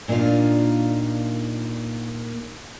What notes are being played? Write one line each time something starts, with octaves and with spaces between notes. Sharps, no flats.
A#2 A#3 D4 D#4 F4